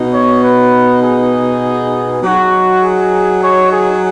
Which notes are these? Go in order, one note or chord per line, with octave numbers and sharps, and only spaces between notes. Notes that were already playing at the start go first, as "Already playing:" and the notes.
Already playing: B2 B3 D#4
C#5
B4
G#4
F#3 D#4 F#4
G#4
C#5
G#4